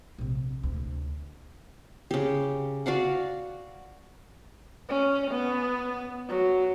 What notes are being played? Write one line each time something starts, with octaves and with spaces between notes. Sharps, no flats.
A#1 C3
D2
C#3 G4
F#4 D5 F5 F#5
C#4
B3
F#3